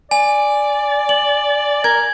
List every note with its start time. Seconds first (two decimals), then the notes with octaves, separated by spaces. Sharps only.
0.11 D5 G#5
1.09 F#7
1.84 A#4 G#6